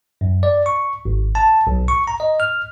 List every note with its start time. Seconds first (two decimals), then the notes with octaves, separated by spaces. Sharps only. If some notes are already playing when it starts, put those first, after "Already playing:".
0.21 F#2
0.43 D5
0.66 C#6
1.05 G#1
1.35 A5
1.67 B1
1.88 C#6
2.07 A#5
2.20 D#5
2.40 F6